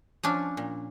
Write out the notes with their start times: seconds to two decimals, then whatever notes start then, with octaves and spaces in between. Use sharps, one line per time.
0.23 F3 C#4 D4
0.57 A#2